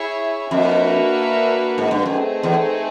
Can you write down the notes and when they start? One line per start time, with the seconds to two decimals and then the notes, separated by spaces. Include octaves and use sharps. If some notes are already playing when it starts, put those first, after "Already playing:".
Already playing: E4 G#4 C#5 E5
0.51 F2 A#3 D4 F#4 B4 E5
1.78 G#2
1.91 G2
2.05 F#2 A3 C4 D#4 G#4
2.43 E2